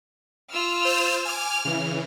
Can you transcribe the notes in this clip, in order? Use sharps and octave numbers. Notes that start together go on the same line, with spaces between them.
F4 E6 F6
C5 G6 A6
G#5 D6 F6
C#3 E3